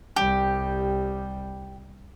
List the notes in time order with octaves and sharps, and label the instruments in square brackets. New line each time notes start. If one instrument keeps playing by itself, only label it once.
[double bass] C2 G3 [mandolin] G4